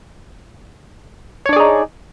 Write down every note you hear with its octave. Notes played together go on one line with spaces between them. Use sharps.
D4 D#4 G#4 C#5 D5